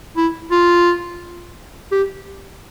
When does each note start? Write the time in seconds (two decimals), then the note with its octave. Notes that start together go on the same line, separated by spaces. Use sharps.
0.17 E4
0.51 F4
1.92 G4